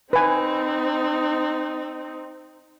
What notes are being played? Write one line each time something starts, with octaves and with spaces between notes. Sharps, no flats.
C4 D#4 B4 G#5